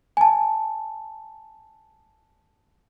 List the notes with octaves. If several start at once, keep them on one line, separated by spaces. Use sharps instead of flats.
G#5 A5